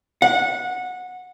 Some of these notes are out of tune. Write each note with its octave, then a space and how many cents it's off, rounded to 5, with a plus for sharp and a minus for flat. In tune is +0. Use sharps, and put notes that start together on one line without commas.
F#5 -20